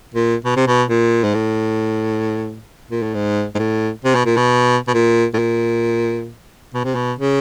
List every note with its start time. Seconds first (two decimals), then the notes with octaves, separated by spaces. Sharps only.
0.14 A#2
0.45 B2
0.56 C3
0.67 B2
0.89 A#2
1.24 G#2
1.34 A2
2.91 A#2
3.02 A2
3.14 G#2
3.55 G#2
3.59 A2
4.04 C3
4.15 B2
4.25 A#2
4.37 B2
4.88 B2
4.94 A#2
5.34 A2
5.39 A#2
6.74 B2
6.84 C3
6.95 B2
7.19 C#3